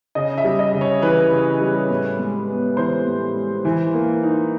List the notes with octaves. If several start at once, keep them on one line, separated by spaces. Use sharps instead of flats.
C#3 D#5
E5
G3
D#5
C#3
C#5
E3 B4
C#3
G3
A2
G#3
B3
E3 C5
A2
G#3
E3
A#3
D#4